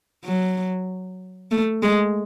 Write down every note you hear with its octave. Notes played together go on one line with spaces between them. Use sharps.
F#3
A3
G#3